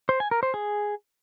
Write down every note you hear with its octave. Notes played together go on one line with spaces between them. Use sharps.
C5
G#5
A#4
C5
G#4